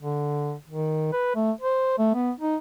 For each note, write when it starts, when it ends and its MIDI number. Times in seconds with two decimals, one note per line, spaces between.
0.01 0.54 50
0.67 1.08 51
1.12 1.32 71
1.35 1.51 57
1.61 1.95 72
1.98 2.14 57
2.15 2.31 59
2.40 2.56 63